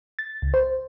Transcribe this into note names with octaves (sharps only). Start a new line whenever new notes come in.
A6
C#2
C5